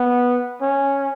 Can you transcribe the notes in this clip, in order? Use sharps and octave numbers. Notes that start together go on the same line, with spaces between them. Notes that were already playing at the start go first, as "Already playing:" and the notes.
Already playing: B3
C#4